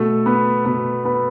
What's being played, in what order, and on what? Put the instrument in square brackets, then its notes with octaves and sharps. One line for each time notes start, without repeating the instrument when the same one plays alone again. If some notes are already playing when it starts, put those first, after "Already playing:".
Already playing: [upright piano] B2 A3 A4
B3 B4
B2 B3 B4
B3 B4